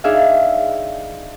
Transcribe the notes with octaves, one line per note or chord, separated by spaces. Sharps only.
D4 D#4 G#4 E5 F5